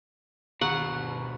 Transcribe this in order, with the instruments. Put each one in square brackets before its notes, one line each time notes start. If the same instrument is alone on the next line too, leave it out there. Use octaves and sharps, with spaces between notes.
[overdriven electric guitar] D2 B2 [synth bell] D#3 A#5 C#6 [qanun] F#5